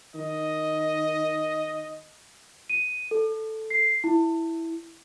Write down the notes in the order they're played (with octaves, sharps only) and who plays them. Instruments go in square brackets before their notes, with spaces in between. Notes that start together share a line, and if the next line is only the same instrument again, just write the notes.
[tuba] D#3 [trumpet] D#5
[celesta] D#7
A4
C7
E4